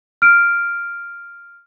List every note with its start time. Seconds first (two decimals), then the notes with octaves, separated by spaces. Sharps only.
0.22 F6 D7